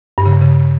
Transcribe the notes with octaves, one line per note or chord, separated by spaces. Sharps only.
G2
C#3
G2
C#3